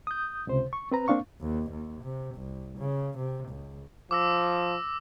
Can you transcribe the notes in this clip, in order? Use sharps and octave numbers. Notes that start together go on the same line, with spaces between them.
D#6 G6
C#2 C3 C5
C#6
C4 B4 A#5
A#3 C4 D4 F5 C#6
D#2
D#2
C3
C2
C#3
C3
C#2
F3 D6 E6 A#6